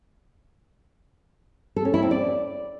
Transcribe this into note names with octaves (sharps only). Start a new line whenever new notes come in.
A4
C#4
E4
C4
D5